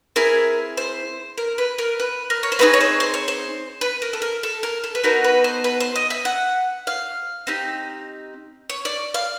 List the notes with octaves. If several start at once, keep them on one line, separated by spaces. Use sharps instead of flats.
C4 E4 G#4 A#4
C5
A#4
B4
A#4
B4
A#4
C#5
C5
A3 C4 D#4 G#4 B4
C#5
C5
C5
C#5
C5
B4
A#4
A4
A#4
A4
A#4
A4
B4
B3 D#4 F#4 A4 A#4
B4
C5
B4
C5
D#5
E5
F#5
F5
C4 D#4 G4
C#5
D5
F5